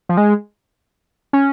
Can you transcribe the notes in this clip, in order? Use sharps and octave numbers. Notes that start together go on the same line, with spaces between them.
F3
G#3
C#4